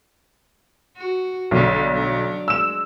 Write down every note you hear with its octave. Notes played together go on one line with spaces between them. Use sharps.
F#4
B1 D3 F#3 G3
F#3 D4
G#3 E6 E7